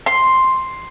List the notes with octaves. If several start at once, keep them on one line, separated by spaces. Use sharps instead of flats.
C6